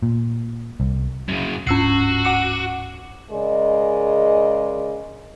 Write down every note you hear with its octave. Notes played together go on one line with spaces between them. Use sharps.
A#2
C2
F#2 C#3
D1 G#2 C#4 D4 F#4 E6 C7
F#5 D6 C#7
C#3 G#3 G#4 A#4 D5 D#5